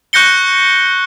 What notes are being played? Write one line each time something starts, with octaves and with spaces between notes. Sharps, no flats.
C#6 F#6 G6 A#6 C#7 G7